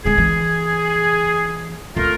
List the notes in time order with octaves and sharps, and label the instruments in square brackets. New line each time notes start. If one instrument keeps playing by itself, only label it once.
[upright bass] D3 G#3 [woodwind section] G#4
[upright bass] E3
[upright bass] C#2 [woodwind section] A3 F4 A#4